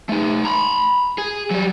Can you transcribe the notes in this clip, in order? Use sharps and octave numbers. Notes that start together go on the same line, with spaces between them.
A3 D#4
A#5 B5
G#4
F#3 G3